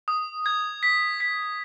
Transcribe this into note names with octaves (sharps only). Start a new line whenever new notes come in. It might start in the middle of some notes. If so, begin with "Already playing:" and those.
D#6
G#6
B6
B6